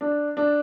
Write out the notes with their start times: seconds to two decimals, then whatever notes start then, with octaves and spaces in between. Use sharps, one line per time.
0.01 D4
0.37 D4